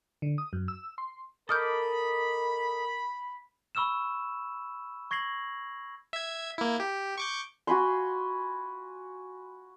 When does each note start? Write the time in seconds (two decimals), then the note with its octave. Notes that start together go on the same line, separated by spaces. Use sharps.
0.22 D3
0.38 D#6
0.53 F#2
0.68 E6
0.98 C6
1.49 A4 A#4 D#5 B5 D6 D#6 F6 G6
3.75 B5 C#6 E6 F6 E7
5.11 C#6 G#6 A#6 C7 F#7
6.13 E5 G#6
6.58 A#3 E4
6.80 G4
7.18 C#6 D6 G6
7.67 F#4 G#5 B5 C6